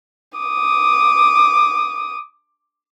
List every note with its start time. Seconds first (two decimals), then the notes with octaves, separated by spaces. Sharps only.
0.38 D6 D#6